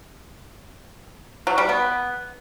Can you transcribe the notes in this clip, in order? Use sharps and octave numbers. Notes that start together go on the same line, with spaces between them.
F#3
G3
B3